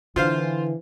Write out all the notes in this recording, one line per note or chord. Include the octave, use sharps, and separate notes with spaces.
D3 E3 F4 C5 F5